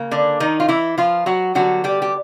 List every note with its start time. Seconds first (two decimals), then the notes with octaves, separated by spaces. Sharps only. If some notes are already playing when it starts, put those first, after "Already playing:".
Already playing: C#3 A#3
0.11 D3 D4
0.40 D#3 D#4
0.60 F4
0.69 E3 E4
0.98 F3 F4
1.26 F#3 F#4
1.55 D3 F#3 G3 B3 F#4
1.84 G3 G4
2.02 G4